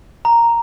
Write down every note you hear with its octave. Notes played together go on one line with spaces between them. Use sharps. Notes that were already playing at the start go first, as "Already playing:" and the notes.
A#5